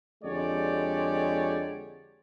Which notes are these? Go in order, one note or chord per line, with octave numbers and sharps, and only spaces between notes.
F2 D3 G#3 G4 C#5 D5